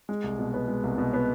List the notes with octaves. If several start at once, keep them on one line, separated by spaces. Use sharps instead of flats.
G#3
C2
B2
B3
G#3
C2
B2
B3